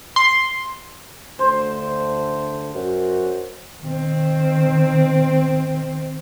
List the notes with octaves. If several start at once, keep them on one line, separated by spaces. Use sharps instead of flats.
C6
D2 A3 C5
F#2 F#4
D#3 C4